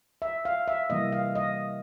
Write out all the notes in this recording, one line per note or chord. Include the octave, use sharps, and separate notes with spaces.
E5
F5
E5
C3 E3 G3 A#3 D#5
F5
D#5